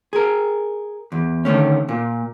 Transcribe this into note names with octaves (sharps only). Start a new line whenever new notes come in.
G#4 A#4
E2
D3 D#3 A3 C#4
A#2